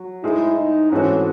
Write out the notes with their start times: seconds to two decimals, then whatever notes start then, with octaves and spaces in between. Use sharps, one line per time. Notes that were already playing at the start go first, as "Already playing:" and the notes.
Already playing: F#3
0.24 A2 G#3 D#4 E4 G#4 C5
0.57 D#4
0.92 G#2 E3 A3 C4 C#4 F#4